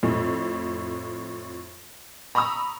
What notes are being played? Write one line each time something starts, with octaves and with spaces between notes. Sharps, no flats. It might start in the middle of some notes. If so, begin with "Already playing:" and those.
F2 A2
A#5 B5 C#6 D#6 E6